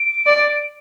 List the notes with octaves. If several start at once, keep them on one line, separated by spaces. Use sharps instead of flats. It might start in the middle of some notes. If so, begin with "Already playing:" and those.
Already playing: D7
D5